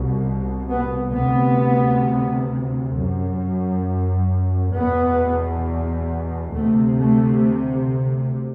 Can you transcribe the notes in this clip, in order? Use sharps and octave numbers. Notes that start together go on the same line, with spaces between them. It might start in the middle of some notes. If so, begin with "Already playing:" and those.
Already playing: C2 B2
B3
D2 C3 B3
F#2
E2 B2 B3
D2 C3 A3
A3